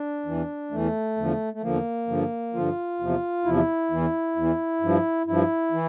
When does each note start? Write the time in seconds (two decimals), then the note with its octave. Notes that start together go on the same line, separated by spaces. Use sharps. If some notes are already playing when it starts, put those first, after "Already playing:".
Already playing: D4
0.26 E2 E3
0.71 E2 E3 A3
1.17 E2 D3 F3
1.53 A3
1.62 E2 D3 F3 A#3
2.08 G2 D3 F3
2.54 G2 D3 F3 F4
3.00 E2 C3 F3
3.44 E2 C3 F3 E4
3.90 E2 E3
4.36 E2 E3
4.81 G2 F3
5.26 G2 F3 E4
5.72 E3